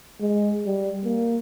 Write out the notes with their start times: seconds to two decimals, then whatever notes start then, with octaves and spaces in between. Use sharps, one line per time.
0.21 G#3
0.66 G3
1.05 A#3